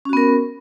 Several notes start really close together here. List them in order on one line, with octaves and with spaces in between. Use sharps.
C#4 F#4 B3 A#4